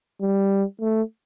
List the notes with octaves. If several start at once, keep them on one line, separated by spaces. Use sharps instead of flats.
G3
A3